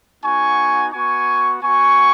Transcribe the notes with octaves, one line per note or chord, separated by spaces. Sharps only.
B3 D#4 F#4 G#5 C#6
B3 F#4 G#5 C#6
B3 F#4 G#5 C#6